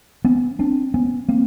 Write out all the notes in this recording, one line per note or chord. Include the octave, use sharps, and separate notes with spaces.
B3 C#4
C4 D4
B3 C#4
A#3 C4